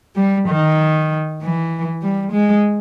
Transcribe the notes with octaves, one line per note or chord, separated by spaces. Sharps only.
G3
D#3
E3
G3
G#3